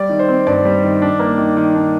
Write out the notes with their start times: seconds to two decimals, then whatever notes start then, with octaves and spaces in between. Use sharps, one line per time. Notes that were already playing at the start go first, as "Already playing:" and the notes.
Already playing: G3 D5
0.09 D#3
0.19 C5
0.29 C4
0.47 G2 D5
0.65 G3
0.84 D#3
1.02 D4
1.19 A#3
1.38 D#3
1.57 D#3
1.75 D4